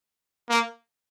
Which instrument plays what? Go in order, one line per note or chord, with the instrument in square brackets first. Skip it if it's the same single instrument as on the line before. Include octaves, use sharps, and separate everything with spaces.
[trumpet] A#3